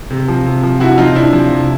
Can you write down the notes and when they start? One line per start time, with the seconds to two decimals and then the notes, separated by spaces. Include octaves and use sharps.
0.10 C3
0.28 F3
0.46 C3
0.63 F3
0.80 C3 E4 F#4
0.98 F3 D#4 F4
1.15 C3 D4 E4
1.33 F3
1.51 C3